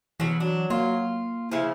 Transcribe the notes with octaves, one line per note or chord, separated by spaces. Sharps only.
B2 E3 F#3
F#3 D4
A#3 F4
C#3 F3 E4